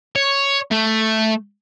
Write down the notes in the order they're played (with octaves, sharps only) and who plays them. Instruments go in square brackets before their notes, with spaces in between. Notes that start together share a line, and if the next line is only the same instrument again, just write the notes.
[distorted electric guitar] C#5
A3